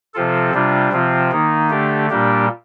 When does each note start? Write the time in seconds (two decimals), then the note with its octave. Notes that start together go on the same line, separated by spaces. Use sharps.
0.14 C3 F3 C4 F4 A4
0.54 C3 G3 D4 F4
0.92 C3 F3 C4 F4
1.32 D#3 A#3 D#4
1.70 D3 A3 D4 G4
2.10 A#2 G3 A#3 D4 G4